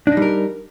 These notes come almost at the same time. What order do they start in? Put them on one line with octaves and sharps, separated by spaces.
D4 D#4 G3 A#4